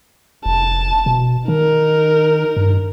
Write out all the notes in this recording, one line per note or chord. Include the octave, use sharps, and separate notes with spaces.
F1 A5
B2
D#3 D#4 A#4
G2